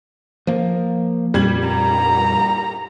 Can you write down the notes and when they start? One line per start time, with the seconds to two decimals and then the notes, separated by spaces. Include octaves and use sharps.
0.47 F3 A#3
1.34 F2 A#2 G3 G#6 F#7
1.68 A#5